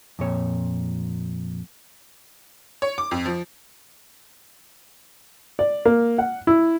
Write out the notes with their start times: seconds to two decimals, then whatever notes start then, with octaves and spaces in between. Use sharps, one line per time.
0.19 F2 A#2 C#5
2.82 C#5
2.98 D6
3.11 F2
3.26 F3
5.59 D5
5.85 A#3
6.18 F#5
6.47 E4